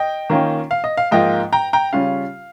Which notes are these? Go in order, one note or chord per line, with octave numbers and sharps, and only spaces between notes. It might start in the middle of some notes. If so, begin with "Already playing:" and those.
Already playing: D#5 G5
D#3 A#3 C#4 F4
F5
D#5
F5
G#2 F3 A#3 F4 D#5 G5
G5 A#5
G5 A#5
C#3 G3 C#4 F4 F5